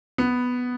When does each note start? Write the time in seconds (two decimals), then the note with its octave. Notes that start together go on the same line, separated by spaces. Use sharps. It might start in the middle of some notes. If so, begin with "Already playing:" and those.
0.18 B3